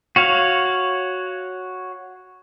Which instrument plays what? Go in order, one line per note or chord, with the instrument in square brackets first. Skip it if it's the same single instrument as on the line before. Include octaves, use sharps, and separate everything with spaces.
[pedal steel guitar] F#4 C#5 F5